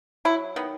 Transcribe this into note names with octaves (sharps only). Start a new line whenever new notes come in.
F#3 E4
D#3 B3